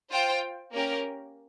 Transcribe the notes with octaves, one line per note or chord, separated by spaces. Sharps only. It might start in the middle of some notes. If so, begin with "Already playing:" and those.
F4 C5 G5
A#3 C#4 G4 A#4